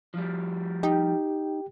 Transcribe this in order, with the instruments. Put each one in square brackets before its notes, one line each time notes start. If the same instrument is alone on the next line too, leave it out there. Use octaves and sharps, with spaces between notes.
[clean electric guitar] F3 G3
[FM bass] D#4 [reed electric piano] G4 G5